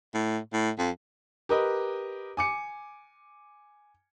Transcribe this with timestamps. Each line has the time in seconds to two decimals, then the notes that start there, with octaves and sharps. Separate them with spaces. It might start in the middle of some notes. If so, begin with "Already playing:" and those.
0.14 A2
0.53 A2
0.79 F2
1.49 G4 A#4 B4 D#5
2.37 G#5 D6 C#7